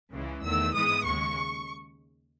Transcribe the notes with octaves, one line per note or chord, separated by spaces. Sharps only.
C#2 C#3 E3 G#3
E2 D#3 A3 E6
G#2 E3 G#3 B3 D#6
D#2 C#3 G#3 C#6